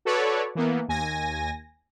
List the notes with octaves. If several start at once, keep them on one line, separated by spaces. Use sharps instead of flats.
F#4 A4 B4 C#5 D5
E3 A#3 B3
D#2 G#5 A#6